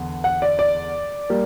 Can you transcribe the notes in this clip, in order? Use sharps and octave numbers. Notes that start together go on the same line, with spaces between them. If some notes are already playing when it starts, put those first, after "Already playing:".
Already playing: E2 D3
F#5
D5
D5
G3 A#3